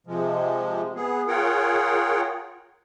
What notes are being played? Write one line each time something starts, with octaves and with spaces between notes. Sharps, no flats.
C3 F3 G#3
B3 G#4
F4 G#4 A#4 C#5 F#5 G5